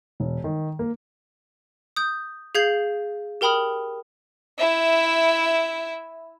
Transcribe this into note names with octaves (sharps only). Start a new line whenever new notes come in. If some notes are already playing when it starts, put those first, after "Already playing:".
E1
D#3
A#3
D#6 G6
G#4 F5 G6 G#6 C7 F#7
G4 A#4 G5 B5 D#6 F6
E4 E5